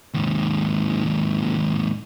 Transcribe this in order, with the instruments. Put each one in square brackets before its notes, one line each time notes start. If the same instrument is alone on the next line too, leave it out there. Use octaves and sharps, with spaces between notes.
[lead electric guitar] D#2 G#2